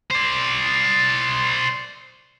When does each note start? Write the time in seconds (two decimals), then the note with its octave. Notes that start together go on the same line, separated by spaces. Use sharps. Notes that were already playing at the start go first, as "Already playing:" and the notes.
0.11 C5 D5